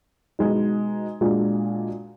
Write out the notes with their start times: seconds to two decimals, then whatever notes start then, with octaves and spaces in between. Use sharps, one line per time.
0.39 B2 G#3 D#4
1.21 A#2 G#3 D4 F#4